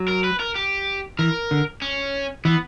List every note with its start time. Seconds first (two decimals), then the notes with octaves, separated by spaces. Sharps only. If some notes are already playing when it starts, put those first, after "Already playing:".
Already playing: F#3
0.08 A#4
0.24 B4
0.40 A#4
0.55 G4
1.19 E3 A#4
1.51 D3
1.82 C#4
2.45 E3 B3